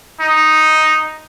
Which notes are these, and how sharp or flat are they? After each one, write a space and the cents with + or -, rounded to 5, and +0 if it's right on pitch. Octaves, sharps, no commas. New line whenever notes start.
D#4 +0